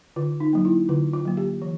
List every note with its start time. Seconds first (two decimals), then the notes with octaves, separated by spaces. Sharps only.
0.16 D3 F4
0.40 D#4
0.53 F#3 A#3
0.65 E4
0.89 D3 F4
1.13 F4
1.25 F#3 A#3
1.37 G4
1.62 E3